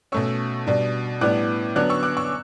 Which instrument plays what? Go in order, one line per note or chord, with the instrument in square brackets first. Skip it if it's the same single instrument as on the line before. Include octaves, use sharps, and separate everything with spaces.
[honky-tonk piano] B2 A3 C#4 C#6 E6
B2 G3 D4
A2 G3 B3 D4 D6 F#6
D3 F#3 B3 D4 D6 F#6
C#6 E6
D6 F#6
C#6 E6